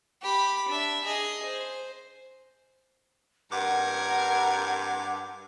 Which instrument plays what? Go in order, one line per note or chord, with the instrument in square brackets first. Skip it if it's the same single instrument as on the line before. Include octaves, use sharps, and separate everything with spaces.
[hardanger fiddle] G4 B5
D4 E5
G#4 D#5
C5
[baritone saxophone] G2 [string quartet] A#4 G#6 [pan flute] F#5 [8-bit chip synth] D6